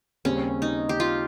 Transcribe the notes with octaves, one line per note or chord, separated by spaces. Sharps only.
D#2 C#3 G3 C4 C#4
D#4
G4
F4